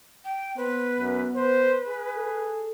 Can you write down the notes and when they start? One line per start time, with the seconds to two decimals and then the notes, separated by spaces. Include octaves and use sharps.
0.25 G5
0.57 B3 B4 C5
1.00 F#2
1.35 B4 C5
1.86 G#4
2.17 A4